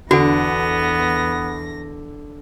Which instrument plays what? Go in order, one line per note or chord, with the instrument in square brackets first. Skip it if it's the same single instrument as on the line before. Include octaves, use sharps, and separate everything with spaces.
[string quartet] E2 A#6 [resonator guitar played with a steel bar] D3 [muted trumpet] B3 [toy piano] F#4 A4